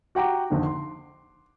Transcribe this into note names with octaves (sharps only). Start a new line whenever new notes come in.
F#4 G4 F#5 G5 A#5 D6
G#1 F2 D3
C6